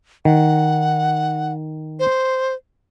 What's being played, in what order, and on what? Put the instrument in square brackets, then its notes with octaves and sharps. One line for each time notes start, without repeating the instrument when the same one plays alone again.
[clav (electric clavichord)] D#3 [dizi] F#5
[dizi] C5